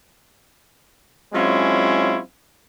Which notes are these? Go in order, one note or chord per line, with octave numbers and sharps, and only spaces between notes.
F#3 G#3 C4 C#4 E4 F4